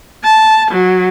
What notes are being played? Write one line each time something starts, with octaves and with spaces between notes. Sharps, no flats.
A5
F#3